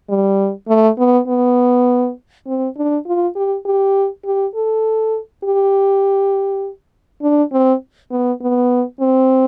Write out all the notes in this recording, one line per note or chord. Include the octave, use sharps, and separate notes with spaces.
G3
A3
B3
B3
C4
D4
F4
G4
G4
G4
A4
G4
D4
C4
B3
B3
C4